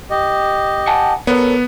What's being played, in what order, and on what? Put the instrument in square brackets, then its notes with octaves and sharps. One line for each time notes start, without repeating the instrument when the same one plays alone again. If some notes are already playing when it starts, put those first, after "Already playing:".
[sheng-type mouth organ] G4 D#5
[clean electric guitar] F#5 G#5 A5
[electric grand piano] B3 [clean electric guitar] A4 A#4 C#5